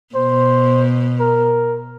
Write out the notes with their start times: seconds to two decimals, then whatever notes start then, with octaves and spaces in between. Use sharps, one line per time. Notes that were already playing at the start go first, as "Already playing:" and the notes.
0.15 B2 C5
1.20 A#4